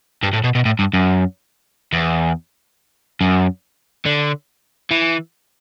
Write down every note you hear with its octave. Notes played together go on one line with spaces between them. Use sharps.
G2
A2
B2
B2
A2
G2
F#2
E2
F#2
D3
E3